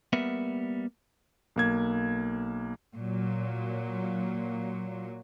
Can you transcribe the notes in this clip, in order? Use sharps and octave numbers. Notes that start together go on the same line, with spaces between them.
G3 A#3 B3 A#4 E5 F#5
B1 A#3 G#6
A#2 F#3